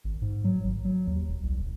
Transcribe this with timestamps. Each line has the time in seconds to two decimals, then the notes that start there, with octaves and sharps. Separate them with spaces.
0.04 G#1
0.22 G#2
0.44 F#3
0.64 G#1
0.85 F#3
1.07 D#2
1.28 E1
1.43 C2
1.59 D#1